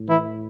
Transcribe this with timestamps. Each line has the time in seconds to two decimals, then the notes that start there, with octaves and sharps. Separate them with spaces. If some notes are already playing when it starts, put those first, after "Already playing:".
Already playing: A2
0.09 E3 E4